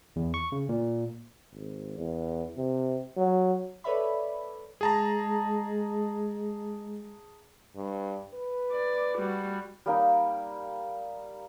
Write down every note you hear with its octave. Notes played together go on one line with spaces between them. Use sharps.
E2
C#6
C#3
A#2
G#1
E2
C3
F#3
A4 B4 C#5 D5 E5 B5
G#3 G#4 A5 A#5
G2
B4
D5
G3 F#4
G3 A#3 D#4